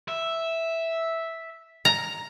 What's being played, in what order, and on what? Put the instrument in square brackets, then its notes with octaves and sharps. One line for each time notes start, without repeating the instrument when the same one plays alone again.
[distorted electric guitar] E5
[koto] A#5